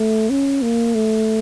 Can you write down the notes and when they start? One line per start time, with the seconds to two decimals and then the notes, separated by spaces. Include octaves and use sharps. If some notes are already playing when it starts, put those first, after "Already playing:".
Already playing: A3
0.30 C#4
0.62 A#3
0.94 A3